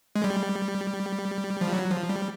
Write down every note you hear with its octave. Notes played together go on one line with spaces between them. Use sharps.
G#3
G3
F3
F#3
F3
G3